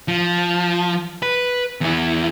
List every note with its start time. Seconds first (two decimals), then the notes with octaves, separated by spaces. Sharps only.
0.08 F3
1.22 B4
1.81 E2 E4